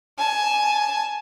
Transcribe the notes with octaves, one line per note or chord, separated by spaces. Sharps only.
G#5 A5